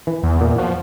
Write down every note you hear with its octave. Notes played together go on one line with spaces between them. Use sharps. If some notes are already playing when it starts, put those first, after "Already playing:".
E3
E2
A#2
F3 F#4